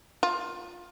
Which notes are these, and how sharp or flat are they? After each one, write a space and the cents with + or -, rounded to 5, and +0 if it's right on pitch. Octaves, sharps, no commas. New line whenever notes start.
F4 +15